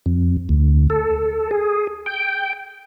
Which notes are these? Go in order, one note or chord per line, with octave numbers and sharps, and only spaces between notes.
F2
D2
A4
G#4
G5